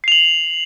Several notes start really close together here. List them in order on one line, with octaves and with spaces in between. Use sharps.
C7 F7 F#7